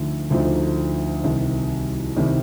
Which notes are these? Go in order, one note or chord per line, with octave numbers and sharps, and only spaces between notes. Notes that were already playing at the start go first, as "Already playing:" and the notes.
Already playing: D2 D3 F3 A3 D#4
D2 D3 F3 A3 D#4
C2 C3 D#3 G3
C2 C3 D#3 G3